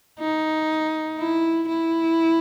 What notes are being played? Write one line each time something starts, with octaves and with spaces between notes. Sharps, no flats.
D#4
E4
E4